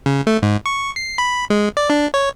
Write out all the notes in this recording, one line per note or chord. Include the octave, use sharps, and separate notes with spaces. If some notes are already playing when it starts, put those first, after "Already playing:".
C#3
A3
G#2
C#6
C7
B5
G#3
D5
D4
C#5